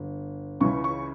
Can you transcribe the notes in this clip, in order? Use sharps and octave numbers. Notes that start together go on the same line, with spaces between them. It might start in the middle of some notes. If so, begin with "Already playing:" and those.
Already playing: G1
C#2 C#3 E3 C#6
C#6